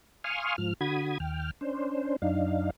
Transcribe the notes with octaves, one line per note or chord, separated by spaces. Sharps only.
F5 G#5 C6 C#6 D#6 F6
G#2 F3 F6
D3 F#4 B5 D#6 G#6
D#2 G5 F6
C#4 D4 C5
F#2 D4 D#4 F5